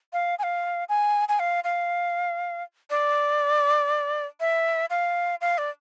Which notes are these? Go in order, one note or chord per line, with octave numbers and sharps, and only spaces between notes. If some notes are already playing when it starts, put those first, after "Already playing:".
F5
G#5
F5
G#5
G#5
F5
F5
D5
E5
F5
F5
D5